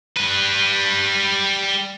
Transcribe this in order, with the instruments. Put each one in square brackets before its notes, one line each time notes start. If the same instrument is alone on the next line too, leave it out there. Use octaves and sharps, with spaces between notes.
[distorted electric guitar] G3 B4